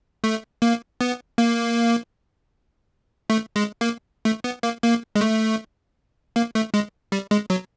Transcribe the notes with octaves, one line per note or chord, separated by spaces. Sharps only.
A3
A#3
B3
A#3
A3
G#3
A#3
A3
B3
A#3
A#3
G#3
A3
A#3
A3
G#3
G3
G#3
F#3